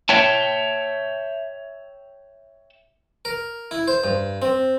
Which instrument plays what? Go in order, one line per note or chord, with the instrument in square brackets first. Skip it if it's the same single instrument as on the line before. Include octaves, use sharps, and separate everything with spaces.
[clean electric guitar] C#5 E5 G5 A5
[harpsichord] A#4
E4
C5
G2
C4